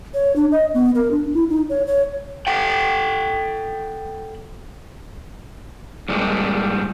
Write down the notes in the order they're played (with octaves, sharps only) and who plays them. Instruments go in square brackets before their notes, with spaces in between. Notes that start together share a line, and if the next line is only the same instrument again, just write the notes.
[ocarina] C#5
D4
D#5
B3
A#4
D4
E4
D#4
C#5
C#5
[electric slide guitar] A4 F#5 G5
G2 A#2 G3 G#3